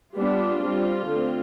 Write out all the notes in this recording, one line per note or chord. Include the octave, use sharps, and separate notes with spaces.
G3 B3 D4 F4
G3 C4
D3 A3 C4